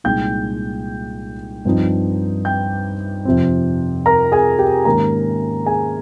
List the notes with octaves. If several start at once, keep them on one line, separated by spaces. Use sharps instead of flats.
C2 A#2 G#3 D#4 G5 G6
G2 F3 C4 D#4
G5 G6
F2 C3 F3 C4
A#4 A#5
G#4 G#5
G4 G5
G#2 D#3 A#3 C#4 A#4 A#5
G#4 G#5